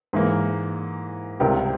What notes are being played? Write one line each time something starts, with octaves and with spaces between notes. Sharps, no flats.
G#2 E3 A#3
C#2 C3 G3 G4 A#4